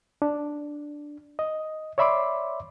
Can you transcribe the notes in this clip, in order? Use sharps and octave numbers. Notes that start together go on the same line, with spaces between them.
D4
D#5
C#5 D5 E5 B5 C6 D6